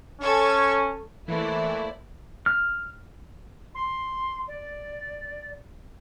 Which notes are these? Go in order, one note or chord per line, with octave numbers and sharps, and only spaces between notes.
C#4 A4 C#6 G#6
E3 A3 A#3 E4 C5 D5
F6
C6
D5